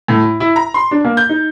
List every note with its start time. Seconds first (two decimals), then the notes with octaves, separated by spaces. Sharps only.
0.08 A2
0.23 E4
0.40 E4
0.56 A#5
0.74 C6
0.91 D4
1.05 A#3
1.17 G6
1.29 D#4